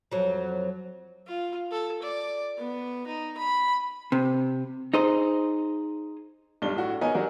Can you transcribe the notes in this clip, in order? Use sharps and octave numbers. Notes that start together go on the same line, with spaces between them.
F2 F#3
F4
A4
D5
B3
D#4
B5
C3
D#4 G#4 C5
B1 G2 G3 D4 G7
A2 F#4
B3 D#4 A#4 C#5 D#5 G#5
F#3 D4 F#4 G4 A#4